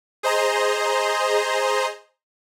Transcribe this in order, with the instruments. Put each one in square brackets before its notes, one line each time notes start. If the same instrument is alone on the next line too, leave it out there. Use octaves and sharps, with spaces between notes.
[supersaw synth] G#4 C5 D#5 A#5 C6